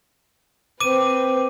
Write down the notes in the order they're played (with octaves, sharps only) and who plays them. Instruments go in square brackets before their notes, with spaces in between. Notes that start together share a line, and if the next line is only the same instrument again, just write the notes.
[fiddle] C4 B4 [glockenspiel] D6 D#7